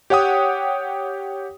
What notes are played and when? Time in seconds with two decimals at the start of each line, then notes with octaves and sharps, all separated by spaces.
0.10 G4 C#5 F#5 G5 D#6